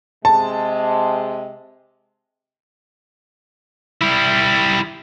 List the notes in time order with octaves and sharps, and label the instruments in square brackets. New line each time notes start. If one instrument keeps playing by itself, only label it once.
[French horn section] C3 G#3 [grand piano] A5
[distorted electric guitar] G3 E4